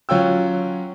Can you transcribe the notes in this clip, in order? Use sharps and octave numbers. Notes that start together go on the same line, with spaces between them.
F#3 C#4 F4 G5 E6